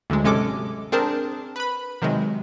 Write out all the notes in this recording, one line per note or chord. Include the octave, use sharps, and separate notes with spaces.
D2 D3 F#3 G#3
G#1 C3 G#3 C#4 A4 D6
C4 D4 G#4 A#4 C5 A5
B4 B5
C3 D#3 F#3 G#3